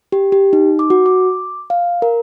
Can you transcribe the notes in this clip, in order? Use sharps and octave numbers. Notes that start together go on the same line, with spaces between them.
G4
G4
D#4
D6
F#4
D6
F5
A#4